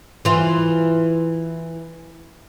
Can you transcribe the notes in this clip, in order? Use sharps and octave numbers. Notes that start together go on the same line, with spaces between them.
E3 F4